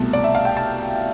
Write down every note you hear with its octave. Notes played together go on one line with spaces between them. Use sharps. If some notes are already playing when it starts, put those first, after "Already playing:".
Already playing: C2 B2 A3 A5
D5
E5
F5
G5
A5